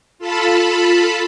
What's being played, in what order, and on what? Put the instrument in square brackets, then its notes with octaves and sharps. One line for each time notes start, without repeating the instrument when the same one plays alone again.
[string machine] F4 A4 A5 B5